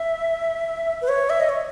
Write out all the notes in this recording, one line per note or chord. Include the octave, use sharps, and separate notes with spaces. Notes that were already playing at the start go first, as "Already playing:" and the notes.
Already playing: E5
B4
C#5
E5
D#5
C#5